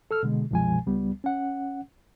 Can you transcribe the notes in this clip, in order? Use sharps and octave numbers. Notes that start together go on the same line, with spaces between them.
A4 E6 F6
B2 D3 G#3
C2 F#2 B2 F3 G#3 G#5
C#2 G3 B3
C#4 F#5